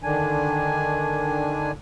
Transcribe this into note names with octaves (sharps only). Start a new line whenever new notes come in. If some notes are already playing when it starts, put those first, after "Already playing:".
D3 D#3 D4 G#5